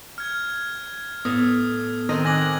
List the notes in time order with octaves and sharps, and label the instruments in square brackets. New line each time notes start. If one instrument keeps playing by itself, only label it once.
[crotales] F6 G#6
[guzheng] A2 [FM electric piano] B3 [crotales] D#6
[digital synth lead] D#3 [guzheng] C4 D4 D#5
[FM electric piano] G#5 D6 F#6 [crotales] G#6 A#6 F#7